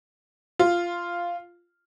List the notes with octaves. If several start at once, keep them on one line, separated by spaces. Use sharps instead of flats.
F4